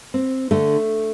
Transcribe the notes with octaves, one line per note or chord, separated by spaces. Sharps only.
C4
D3 A3